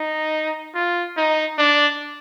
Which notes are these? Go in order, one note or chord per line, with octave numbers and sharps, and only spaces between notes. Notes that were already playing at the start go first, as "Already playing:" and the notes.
Already playing: D#4
F4
D#4
D4